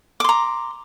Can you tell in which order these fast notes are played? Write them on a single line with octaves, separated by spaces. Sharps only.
D6 C6 A#5